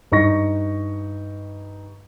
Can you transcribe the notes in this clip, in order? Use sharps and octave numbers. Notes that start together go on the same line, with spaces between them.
G2 D#4 C#6 A#6